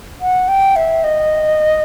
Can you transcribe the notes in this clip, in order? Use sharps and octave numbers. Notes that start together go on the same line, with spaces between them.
F#5
G5
E5
D#5